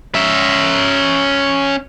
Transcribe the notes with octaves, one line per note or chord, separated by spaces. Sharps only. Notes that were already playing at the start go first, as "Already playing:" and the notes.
C#4 E5